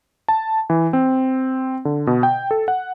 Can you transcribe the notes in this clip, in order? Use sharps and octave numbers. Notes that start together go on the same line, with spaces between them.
A5
E3
C4
D3
B2
G5
A4
F#5